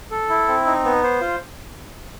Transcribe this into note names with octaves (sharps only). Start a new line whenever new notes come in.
A4
E4
C4
D#4
B3
C5
F4